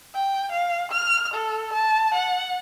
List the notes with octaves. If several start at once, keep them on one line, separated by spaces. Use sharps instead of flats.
G5
F5
F6
A4
A5
F#5